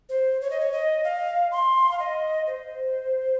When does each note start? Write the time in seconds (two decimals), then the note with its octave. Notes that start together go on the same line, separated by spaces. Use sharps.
0.09 C5
0.41 C#5
0.51 D#5
0.60 C#5
0.73 D#5
1.04 F5
1.51 C6
1.91 F5
1.99 D#5
2.47 C5